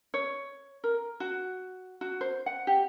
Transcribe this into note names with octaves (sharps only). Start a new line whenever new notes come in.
C#5
A#4
F#4
F#4
C5
F#5
G4